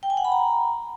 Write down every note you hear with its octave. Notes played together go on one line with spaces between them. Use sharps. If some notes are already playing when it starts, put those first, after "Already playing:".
G5
G#5
F#5
B5
A#5